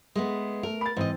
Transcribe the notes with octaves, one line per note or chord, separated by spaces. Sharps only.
G#3 A3 B3
A3 A#4
B5 A6
G#2 E3 C4 D#5